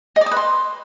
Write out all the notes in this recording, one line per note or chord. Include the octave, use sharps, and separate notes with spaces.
D#5
D5
D#6
B4
C6